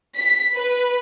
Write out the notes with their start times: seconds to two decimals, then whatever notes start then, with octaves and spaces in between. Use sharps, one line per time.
0.17 B6
0.56 B4